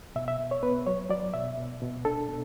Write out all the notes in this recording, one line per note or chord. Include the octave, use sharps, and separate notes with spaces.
B2 E5
E5
B2
C#5
B3 B4
F#3 C#5
F#3 D5
B2 E5
B2
B2
D4 A4
B2